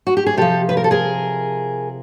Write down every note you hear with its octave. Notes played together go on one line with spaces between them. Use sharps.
F#4
G4
G#4
C3 F3 G4 A4
B4
A#4
A4
G#4 A#4